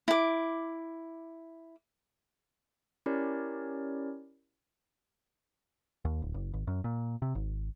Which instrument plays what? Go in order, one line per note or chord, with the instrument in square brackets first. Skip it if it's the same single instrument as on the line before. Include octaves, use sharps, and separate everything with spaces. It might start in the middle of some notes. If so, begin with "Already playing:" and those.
[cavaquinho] E4 D6
[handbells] C#4 E4 G4 A#4 C#5 D5
[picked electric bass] D#2
D1
F#1
G#1
F#2
A#2
C3
G#1